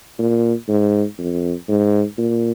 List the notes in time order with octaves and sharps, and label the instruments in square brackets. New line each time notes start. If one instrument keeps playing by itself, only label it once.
[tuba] A#2
G#2
F2
G#2
A#2